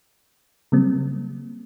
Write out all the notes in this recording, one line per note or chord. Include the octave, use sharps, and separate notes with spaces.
C#3 F#3 G3 A#3 C4